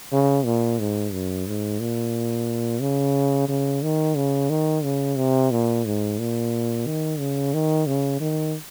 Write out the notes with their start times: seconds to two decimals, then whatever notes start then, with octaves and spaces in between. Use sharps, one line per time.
0.13 C#3
0.45 A#2
0.80 G#2
1.13 F#2
1.47 G#2
1.80 A#2
2.81 C#3
3.49 C#3
3.83 D#3
4.17 C#3
4.50 D#3
4.84 C#3
5.17 C3
5.51 A#2
5.86 G#2
6.19 A#2
6.86 D#3
7.19 C#3
7.54 D#3
7.87 C#3
8.21 D#3